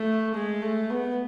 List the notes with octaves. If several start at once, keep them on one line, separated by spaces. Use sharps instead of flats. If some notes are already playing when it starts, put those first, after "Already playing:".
Already playing: A3
G#3
A3
B3